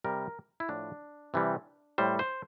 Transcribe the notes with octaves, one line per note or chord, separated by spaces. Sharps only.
C3 G3 A#4
E4
A2 F3 D4
C3 E3 G3
A2 G3 C5
C5